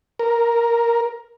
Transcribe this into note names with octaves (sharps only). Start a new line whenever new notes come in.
A#4